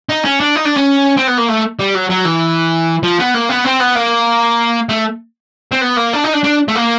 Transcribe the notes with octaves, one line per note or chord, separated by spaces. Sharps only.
D#4
C#4
D4
D#4
D4
C#4
C4
B3
A#3
A3
G3
F#3
F#3
E3
F3
B3
A#3
B3
C4
B3
A#3
A3
C4
B3
A#3
D4
D#4
D4
D4
A3
A#3